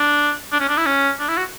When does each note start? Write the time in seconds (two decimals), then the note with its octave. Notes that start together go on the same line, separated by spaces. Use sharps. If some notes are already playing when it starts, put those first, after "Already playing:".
Already playing: D4
0.52 D4
0.60 C#4
0.69 D4
0.78 E4
0.86 C#4
1.20 D4
1.29 E4
1.37 F#4